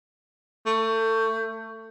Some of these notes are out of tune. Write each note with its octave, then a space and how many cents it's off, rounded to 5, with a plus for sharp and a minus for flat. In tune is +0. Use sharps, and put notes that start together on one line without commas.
A3 +25